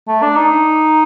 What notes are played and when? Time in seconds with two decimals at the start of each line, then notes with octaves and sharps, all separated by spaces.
0.08 A3
0.23 D4
0.36 D#4